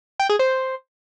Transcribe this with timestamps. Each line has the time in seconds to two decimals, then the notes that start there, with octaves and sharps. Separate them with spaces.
0.20 G5
0.29 G#4
0.39 C5